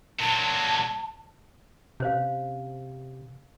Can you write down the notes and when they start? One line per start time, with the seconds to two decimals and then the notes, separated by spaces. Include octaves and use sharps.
0.20 A#2 F#3 A5
2.00 C3 C#4 C5 F5